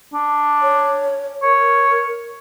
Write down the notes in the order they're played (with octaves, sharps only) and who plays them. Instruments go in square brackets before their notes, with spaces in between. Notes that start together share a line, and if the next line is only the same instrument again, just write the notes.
[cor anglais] D4
[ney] C#5
[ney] A#4 [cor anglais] C#5